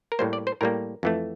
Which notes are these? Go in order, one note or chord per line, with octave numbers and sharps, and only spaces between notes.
A#4
A2 G3 A#3 C5
D5
C5
A2 G3 A#3 A#4
F2 E3 A3